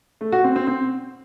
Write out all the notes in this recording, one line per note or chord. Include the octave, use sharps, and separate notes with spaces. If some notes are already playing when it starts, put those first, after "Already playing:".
A3
F#4
C4
C4
C4